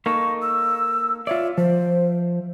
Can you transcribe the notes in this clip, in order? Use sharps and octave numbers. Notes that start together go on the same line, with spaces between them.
A#3 D#4 A4 C#6
E6
F4 C#5 D5 E5
F3 C5